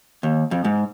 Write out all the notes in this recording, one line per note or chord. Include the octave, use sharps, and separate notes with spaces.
D#2
F2
G#2